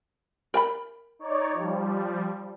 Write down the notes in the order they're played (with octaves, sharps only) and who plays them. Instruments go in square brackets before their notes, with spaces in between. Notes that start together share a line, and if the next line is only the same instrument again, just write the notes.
[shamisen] A#4 G#5 B5
[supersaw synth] D#4 C#5 D5
F3 G3